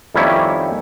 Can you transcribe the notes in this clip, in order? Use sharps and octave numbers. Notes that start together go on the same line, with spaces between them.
F2 D#3 G3 A#3 C#4 E4